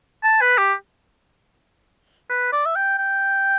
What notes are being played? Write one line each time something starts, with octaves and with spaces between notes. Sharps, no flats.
A5
B4
G4
B4
D5
E5
G5
G5